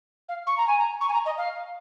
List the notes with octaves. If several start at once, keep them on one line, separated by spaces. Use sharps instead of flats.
F5
C#6
A#5
G#5
A#5
C#6
G#5
A#5
D#5
F5